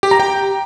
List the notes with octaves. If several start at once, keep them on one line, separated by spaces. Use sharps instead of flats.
G4
A#5
G5